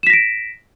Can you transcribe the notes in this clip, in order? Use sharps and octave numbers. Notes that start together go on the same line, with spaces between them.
A#6 B6 D7 E7